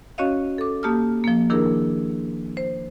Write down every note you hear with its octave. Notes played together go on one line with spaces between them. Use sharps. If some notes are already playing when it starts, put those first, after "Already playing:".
C#4 F#4 C#5 D#5 F5
A4 D6
A#3 G4 A5 D#6 F6
F3 A#3
D#3 D4 E4 G#4 A#4
C5